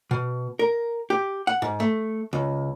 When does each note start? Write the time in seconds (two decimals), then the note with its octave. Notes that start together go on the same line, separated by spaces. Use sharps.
0.11 B2
0.59 A#4
1.10 G4
1.47 F#5
1.62 G#2
1.80 A3
2.33 C#2